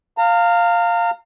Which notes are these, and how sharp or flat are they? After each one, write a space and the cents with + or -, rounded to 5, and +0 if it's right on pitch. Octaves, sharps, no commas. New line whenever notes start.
F5 +0 A#5 -35